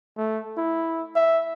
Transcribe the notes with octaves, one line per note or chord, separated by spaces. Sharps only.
A3
E4
E5